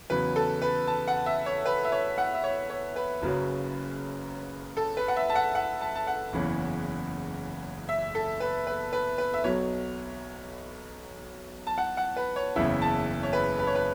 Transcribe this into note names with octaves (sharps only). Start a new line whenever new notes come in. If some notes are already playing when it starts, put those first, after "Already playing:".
E2 C#3 F#3 B4
A4
B4
A5
F#5
E5
C#5
B4
E5
C#5
F#5
E5
C#5
C#5
B4
F#1 F#2 C#3 F#3
A4
B4
F#5
E5
A5
F#5
F#5
A5
A5
F#5
F#1 E2 C#3 E3
E5
A4
B4
B4
B4
B4
E5
B1 B2 F#3 C#5
A5
F#5
F#5
B4
C#5
F#1 E2 C#3 E3 E5
A5
C#5
B4
B4
C#5
B4